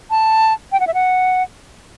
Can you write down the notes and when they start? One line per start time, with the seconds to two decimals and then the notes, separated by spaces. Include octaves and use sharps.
0.10 A5
0.72 G5
0.80 F#5
0.87 E5
0.94 F#5